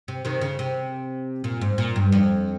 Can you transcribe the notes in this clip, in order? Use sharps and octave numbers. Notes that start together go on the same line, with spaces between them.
C3
C3 D#3
C#3
C3
A#2
G#2
A#2
G2
F2